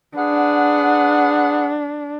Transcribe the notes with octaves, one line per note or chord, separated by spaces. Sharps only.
D4 G#4 B4 F#5